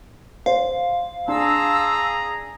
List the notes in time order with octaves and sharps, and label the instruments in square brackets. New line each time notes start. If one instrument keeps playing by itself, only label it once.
[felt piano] C5 [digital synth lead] F5
[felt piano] D4 [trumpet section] G#4 A#5 [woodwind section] A5 C6 E6